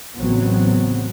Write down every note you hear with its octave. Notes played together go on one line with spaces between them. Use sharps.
A1 A2 C#3 F#3 B3 C4